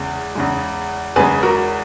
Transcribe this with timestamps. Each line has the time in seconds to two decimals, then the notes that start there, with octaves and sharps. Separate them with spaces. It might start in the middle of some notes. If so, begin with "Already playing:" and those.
Already playing: E2 C#3 G#3
0.35 E2 C#3 G#3
1.16 E2 C#3 G#3 G#4 B4
1.43 F#4 A#4